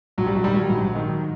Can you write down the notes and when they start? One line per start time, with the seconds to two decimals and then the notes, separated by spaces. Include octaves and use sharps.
0.18 A#1 F#3
0.26 G3
0.36 F#3
0.44 G#2 D#3 G3
0.54 F#3
0.69 A#1 F#3
0.95 G#2 D#3